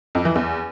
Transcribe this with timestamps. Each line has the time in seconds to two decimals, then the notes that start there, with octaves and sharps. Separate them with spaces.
0.15 F2
0.25 E3
0.36 E2